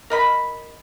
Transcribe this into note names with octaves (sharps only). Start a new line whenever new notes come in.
A#4 D#5 B5